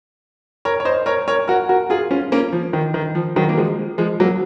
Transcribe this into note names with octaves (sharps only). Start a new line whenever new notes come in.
A#4 C#5
C#5
C5 D#5
A#4 C#5
A#4 C#5
F#4 A#4
F#4 A#4
F4 G#4
C#4 F4
A#3 C#4
F3
D#3
D#3
F3
D#3 F#3
A#3
F3 G#3
F3 G#3
F#3 A#3